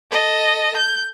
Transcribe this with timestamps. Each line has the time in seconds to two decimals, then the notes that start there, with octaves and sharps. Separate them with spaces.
0.12 A4 D#5
0.77 G6